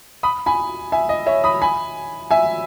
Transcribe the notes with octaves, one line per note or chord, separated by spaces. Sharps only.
B5 D#6
G#5 B5
E5 G#5
D#5
C#5 E5
B5 D#6
G#5 B5
E5 G#5